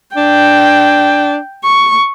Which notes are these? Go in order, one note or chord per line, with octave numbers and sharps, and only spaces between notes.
D4 G5
C#6